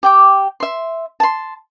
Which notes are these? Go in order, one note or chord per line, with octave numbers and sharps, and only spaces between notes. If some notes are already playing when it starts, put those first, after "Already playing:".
G4 G5 D6
E5 C6
A5 C6